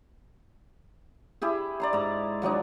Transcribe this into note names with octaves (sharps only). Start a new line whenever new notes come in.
E4 G4 G#4
D5 A#5 C6
G#2 A#5
F3 F#3 D4 D#4